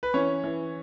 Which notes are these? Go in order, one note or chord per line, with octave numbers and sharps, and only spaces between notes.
B4
E3 C#4 C#5
E3